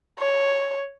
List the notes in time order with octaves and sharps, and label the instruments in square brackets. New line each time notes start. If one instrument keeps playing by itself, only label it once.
[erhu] C#5